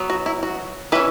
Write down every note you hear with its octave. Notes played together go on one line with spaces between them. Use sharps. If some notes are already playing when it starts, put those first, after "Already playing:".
Already playing: F#3 B3
F#4
E4
F#4
E3 C#4 B4 E5